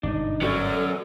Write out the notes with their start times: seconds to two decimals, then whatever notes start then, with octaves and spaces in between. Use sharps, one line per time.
0.03 G1 G#2 B2 D4 D#4
0.41 F#3 B3 C#4 F#4 A4 D5